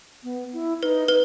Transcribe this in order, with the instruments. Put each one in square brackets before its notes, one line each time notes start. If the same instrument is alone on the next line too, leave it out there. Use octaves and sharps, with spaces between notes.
[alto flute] B3
E4
[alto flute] D#4 [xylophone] B4
[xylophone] B4